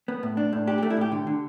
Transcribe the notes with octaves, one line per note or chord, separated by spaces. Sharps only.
B3
A2
D4
A2
D4 G4
G4
A3
E4
A2 G4
D3
D3